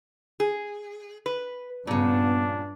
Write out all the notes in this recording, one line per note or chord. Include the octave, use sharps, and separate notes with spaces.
G#4
B4
G2 A#2 C#3 B3 D4